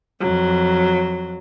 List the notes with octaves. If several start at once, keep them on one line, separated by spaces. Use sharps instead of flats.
F2 F#3